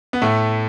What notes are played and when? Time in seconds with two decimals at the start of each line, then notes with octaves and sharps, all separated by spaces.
0.13 B3
0.22 A2 A3